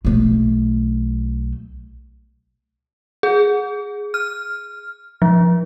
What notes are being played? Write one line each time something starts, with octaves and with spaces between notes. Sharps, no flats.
B1 A3
G#4
F6
F3